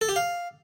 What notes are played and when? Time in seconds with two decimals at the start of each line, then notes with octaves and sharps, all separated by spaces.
0.01 A4
0.09 G4
0.16 F5